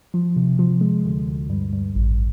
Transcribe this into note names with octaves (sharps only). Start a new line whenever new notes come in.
F3
C3
F3
G#3
D2
D2
G2
G2
A1